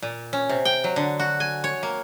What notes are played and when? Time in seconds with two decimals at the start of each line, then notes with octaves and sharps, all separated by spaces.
0.02 A#2
0.33 C#4
0.49 C3
0.65 G5
0.84 F#3
0.96 D3
1.20 F#4
1.40 G#5
1.64 C#5
1.83 A#3